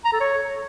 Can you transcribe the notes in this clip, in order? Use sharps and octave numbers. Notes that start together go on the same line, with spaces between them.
A#5
A4
C#5